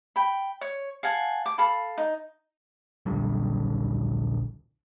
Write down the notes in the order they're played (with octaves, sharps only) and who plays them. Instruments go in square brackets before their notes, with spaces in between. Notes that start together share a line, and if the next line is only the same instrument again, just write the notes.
[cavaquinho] G5 B5
C#5
F5 F#5 G#5 A5
D6
A4 F5 B5
D#4
[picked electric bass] D#1 A#1 D3 G3